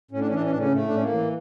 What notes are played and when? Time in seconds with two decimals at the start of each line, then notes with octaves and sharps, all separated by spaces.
0.11 A2 C#4
0.19 D4
0.27 C#4
0.31 E3 D4
0.43 C#4
0.50 A2 D4
0.58 C#3 C#4
0.71 A2 A3
0.87 D4
0.92 A2 C#4
1.02 A#3
1.12 E3